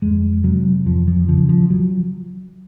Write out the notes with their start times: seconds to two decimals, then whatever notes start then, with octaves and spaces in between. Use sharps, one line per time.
0.02 F2 G#3
0.44 C3 F#3
0.86 F2 F3
1.07 F3
1.28 C#3 F3
1.49 F3
1.70 F#3